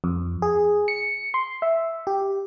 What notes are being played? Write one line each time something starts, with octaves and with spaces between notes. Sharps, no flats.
F2
G#4
C#7
C6
E5
G4